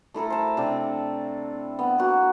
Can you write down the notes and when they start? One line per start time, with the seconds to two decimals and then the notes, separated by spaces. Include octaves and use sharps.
0.14 A3 E4 A4 A#4
0.30 C5 A5
0.57 C3 D4
1.79 B3
1.98 A#3 F#4